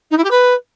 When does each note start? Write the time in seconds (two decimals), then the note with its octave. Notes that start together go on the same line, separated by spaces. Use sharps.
0.11 D#4
0.17 E4
0.24 G4
0.30 B4